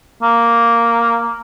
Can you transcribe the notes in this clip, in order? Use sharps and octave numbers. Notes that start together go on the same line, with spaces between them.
A#3